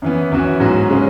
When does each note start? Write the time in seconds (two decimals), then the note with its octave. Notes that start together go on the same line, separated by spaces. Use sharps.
0.02 F#2 E3 B3
0.32 F#2 E3 B3 F#4
0.60 G#2 F#3 C#4 F#4
0.90 C#3 G#3 C#4